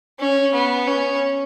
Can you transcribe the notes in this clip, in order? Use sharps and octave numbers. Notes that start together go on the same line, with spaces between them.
C#4
B3
C#4